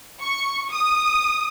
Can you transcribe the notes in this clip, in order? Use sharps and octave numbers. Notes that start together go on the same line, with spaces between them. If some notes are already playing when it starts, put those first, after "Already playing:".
C#6
D#6